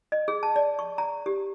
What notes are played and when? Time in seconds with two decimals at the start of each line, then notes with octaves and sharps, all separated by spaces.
0.12 D#5
0.28 G#4
0.43 A5
0.56 D5
0.79 C#6
0.98 A#5
1.26 G4